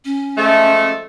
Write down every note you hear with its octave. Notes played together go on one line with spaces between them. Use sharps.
C#4
F3 G#3 A3